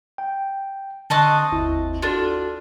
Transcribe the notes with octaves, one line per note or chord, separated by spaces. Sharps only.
G5
D3 C4 D#5 A5 C#6 F#6
G1 D#2 E4
D4 F4 F#4 A4